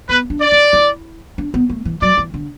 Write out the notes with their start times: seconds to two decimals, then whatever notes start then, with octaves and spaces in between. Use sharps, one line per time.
0.09 B3 B4
0.30 D4
0.41 D5
0.52 E4
0.73 E4
1.38 D4
1.54 B3
1.69 A3
1.85 E3
2.01 F#3 D5
2.18 E3
2.34 D3